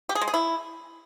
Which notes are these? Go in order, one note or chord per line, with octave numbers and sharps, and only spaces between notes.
G4
G#4
G#3
G#4
E4